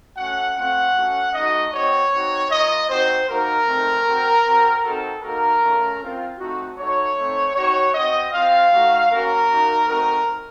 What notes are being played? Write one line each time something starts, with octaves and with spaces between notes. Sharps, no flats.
A3 C#4 F#4 F#5
A3 C4 F4 F#5
A3 C#4 F#4
A3 D#4 F#4 D#5
C4 F#4 C#5
C4 D#4 F#4
A#3 F4 D#5
C4 D#4 F#4 C5
A#3 D#4 F#4 A#4
A3 C4 D#4
C4 F#4
C4 F#4
C4 D#4 F#4 A4
A#3 D#4 F#4 A#4
A3 C#4 F4
C4 F4
A3 C4 D#4 F#4
A3 D#4 F#4 C#5
A3 C4 D#4
C4 D#4 F#4 C#5
C4 F#4 D#5
C4 F4 F5
A3 D#4 F#4
A#3 C#4 F#4 A#4
A#3 D#4 F#4
A3 C4 D#4 F#4 A#4